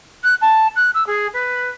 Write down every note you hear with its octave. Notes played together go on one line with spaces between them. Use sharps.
F#6
A5
F#6
E6
G#4
B4